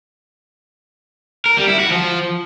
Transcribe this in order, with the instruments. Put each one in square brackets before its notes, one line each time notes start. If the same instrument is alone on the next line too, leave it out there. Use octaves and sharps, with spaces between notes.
[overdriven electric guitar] A#4
G3
E4
F#4
F3